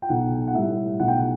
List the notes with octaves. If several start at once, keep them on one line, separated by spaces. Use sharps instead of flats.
G5
B1 F#5
F#5
A2 G3 E5
B1 F#5
G5
F#5